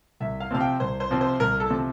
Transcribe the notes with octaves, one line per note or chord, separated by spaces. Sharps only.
C2 E5
F5
C3 F3 C4 F5
G5
C2 C5
C5
C3 F3 C4
C5
C2 A#4
A4
C3 F3 C4